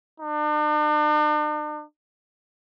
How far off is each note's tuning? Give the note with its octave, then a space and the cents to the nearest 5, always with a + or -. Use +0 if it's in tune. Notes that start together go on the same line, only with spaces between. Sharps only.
D4 +45